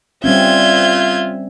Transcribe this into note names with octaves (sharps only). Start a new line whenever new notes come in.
G3 C4 C#4 F4 E5 G6 G#6